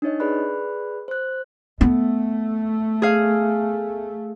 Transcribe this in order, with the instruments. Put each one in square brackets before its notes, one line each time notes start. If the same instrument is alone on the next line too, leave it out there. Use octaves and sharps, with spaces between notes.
[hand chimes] D4 D#4 C#5 D#5
G#4 B4 D5 B5 F#6
C5 F#6
[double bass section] A3 [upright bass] B3
[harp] G#4 F5